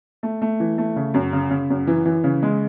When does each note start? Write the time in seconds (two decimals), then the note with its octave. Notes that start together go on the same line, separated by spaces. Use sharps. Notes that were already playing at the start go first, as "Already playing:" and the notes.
0.23 A3
0.42 A3
0.60 E3
0.78 A3
0.96 C#3
1.14 F#2
1.33 C#3
1.51 C#3
1.70 F#2
1.87 E3
2.06 E3
2.24 C#3
2.42 G#3